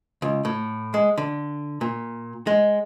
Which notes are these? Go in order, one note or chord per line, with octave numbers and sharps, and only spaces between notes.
C#2
A2
G#3
D3
A#2
G#3